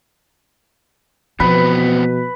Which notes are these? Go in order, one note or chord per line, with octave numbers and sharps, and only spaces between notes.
B2 E3 F3 B3 C4 B4